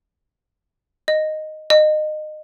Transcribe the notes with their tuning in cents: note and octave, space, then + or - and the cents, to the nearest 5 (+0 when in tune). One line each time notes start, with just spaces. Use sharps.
D#5 -5
D#5 -25